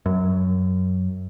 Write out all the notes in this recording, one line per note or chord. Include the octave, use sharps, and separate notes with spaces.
F#2